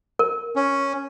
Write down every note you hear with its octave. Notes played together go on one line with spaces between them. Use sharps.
A#4
C#4